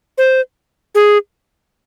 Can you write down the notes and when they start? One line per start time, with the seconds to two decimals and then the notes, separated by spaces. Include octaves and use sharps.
0.18 C5
0.95 G#4